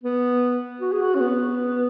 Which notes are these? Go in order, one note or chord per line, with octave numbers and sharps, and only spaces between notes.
B3
F#4
G#4
F#4
C#4
B3